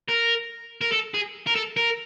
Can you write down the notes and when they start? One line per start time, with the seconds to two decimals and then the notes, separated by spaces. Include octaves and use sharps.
0.09 A#4
0.81 A#4
0.92 A4
1.14 G#4
1.47 A#4
1.55 A4
1.77 A#4